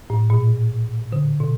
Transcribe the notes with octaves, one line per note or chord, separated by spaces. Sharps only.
A2
A#2
D3
B2